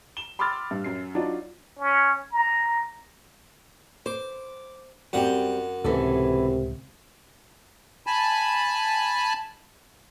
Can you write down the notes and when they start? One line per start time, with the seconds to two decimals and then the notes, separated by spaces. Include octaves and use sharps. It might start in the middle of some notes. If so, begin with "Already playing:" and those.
0.17 E7 G7
0.39 B5 C6 D6 E6 F6 A6
0.71 G2
0.84 F#2 C7
1.15 F#3 D4 D#4 F4
1.78 C#4
2.32 A#5
4.06 C5 D6
5.13 F#2 G3 C4 G4 F#5
5.84 C#2 A2 C3 E3 C#4 A4
8.07 G#5 A5 B5